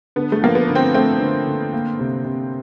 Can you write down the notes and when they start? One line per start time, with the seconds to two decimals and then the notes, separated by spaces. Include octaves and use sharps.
0.16 D3 B3
0.32 A3
0.42 F3 A#3
0.55 B3
0.69 D3
0.75 C4
0.94 A3 C4
1.21 D3
1.47 D3
1.73 A#3
1.99 C3
2.25 C3